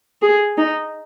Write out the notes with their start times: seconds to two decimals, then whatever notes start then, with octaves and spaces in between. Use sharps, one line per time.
0.22 G#4
0.58 D#4